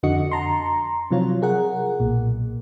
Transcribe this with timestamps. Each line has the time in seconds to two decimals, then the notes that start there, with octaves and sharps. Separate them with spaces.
0.03 F2 D3 F#4 D#5 C#7
0.31 A5 A#5 C6
1.11 C3 F3 F#3 F4 C#5
1.42 G#4 A#4 F#5
2.00 B1 A#2